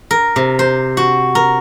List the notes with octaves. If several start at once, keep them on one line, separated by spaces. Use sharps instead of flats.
A#4
C3
C5
F#4
A#4